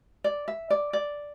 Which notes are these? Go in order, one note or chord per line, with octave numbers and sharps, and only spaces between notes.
D5
E5
D5
D5